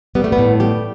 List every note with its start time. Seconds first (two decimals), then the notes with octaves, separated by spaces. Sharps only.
0.15 G3 B3
0.24 A3
0.32 B3
0.38 A2
0.60 G3 G4